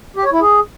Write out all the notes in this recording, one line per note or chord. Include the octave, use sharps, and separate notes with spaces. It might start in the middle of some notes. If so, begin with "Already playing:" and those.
G4
C#5
E4
G#4